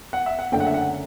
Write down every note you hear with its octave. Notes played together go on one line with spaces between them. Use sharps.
F#5
E5
F#5
F#1 F#2 D3 A3 D4 G5
F#5
E5
F#5